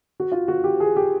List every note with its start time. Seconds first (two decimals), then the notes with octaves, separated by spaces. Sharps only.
0.20 F#4
0.32 F4
0.48 F#4
0.64 G4
0.80 G#4
0.96 G4